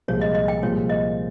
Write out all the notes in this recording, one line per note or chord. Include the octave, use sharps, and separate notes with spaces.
C2 A#2 F3 G#3 C4 C#5
D#5
D#5
G5
C2 A#2 F3 G#3 C#5
D#5